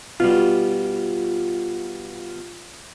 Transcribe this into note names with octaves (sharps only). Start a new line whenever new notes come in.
B2 G3 F4